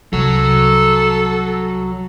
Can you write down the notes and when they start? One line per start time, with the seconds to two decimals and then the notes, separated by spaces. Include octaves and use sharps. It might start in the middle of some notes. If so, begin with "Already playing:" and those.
0.13 C2 F#3 A4